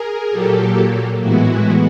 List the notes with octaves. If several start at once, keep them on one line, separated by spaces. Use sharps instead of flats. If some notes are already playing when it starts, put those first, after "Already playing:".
Already playing: G#4 A#4
A#2 F#3 A#3 G4 A4
A2 E3 G#3 B3 E4 F#4